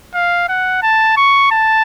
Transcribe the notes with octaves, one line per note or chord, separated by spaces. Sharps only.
F5
F#5
A5
C#6
A5